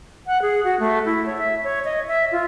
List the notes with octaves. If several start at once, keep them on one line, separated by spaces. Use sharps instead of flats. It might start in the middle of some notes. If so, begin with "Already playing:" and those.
F#5
G#4
F#4
A3
E4
C#5
E5
C#5
D#5
E5
F4